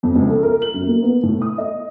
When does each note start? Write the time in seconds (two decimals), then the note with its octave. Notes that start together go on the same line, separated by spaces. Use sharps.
0.03 F2
0.15 C#2
0.28 A4
0.43 A#4
0.62 F#7
0.74 F#2
0.87 A#3
1.03 B3
1.23 A2
1.42 D#6
1.58 D#5